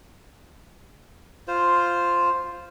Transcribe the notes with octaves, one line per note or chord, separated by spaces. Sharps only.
F4 C5